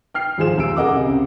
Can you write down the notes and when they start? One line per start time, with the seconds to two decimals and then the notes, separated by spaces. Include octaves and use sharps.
0.14 G5 F6 C7
0.38 D#2 G#2 F3 G#4 C5 E7
0.58 D#1 E6 D7
0.76 G#4 A#4 D#5 F#5 D6
0.93 C#2 C3